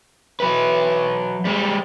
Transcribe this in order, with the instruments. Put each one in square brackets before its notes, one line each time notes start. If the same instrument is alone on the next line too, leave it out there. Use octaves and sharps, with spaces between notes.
[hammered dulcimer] E3 [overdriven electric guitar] F#3 B4
[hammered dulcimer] C3 [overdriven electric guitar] G3 G#3